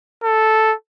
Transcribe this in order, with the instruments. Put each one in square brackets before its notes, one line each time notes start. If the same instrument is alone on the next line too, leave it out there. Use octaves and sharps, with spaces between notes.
[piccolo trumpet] A4